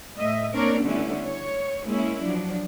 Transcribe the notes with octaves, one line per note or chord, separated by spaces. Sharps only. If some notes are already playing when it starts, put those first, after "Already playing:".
A2 D#5 E5
A#3 C4 D4 A#4 C#5 D5
D3 G3 A3 B3 C#4 E4
C#5
G#3 A#3 C#4 E4
F3 F#3 D4